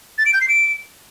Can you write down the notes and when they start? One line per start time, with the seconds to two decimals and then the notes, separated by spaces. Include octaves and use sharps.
0.18 A6
0.26 D7
0.33 G6
0.41 C7
0.49 D7